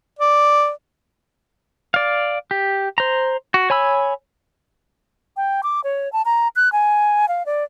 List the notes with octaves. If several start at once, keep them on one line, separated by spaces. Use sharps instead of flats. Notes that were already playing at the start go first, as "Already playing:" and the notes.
D5
D5 F5
G4
C5 A#5
F#4
C#5 G#5 B5 E6
G5
D6
C#5
A5
A#5
F#6
G#5
F5
D5